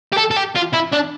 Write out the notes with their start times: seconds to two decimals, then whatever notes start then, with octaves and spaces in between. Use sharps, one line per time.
0.13 G4
0.18 A4
0.31 A4
0.37 G4
0.55 F4
0.73 E4
0.92 D4